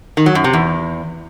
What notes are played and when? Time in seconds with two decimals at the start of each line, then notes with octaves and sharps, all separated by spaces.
0.17 D#3
0.26 F#3
0.35 F#2
0.44 C3
0.53 E2